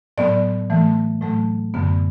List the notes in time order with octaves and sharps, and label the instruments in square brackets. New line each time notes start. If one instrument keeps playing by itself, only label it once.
[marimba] A2 F#3 B3 D5
A2 E3 A3
A2 F#3 A3
F#2 D3 B3